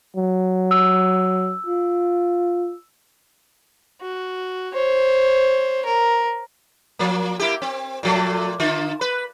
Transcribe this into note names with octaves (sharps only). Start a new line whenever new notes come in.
F#3
E6
F4
F#4
C5 C#5
A#4
F3 A#3
A#3 E4 G4
C4
A#2 F3 A3
D3 F4
B4